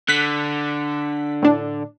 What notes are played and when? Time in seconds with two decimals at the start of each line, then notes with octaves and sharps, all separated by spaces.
0.08 D3 F#6 B6
1.42 A2 D4